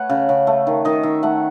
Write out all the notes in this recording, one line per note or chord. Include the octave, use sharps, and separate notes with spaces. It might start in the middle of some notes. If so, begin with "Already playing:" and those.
Already playing: A3 B4 C#5 F#5
C#3
C#3
A3
D#3
D#3 D#5
D#3 E5
A3 F#5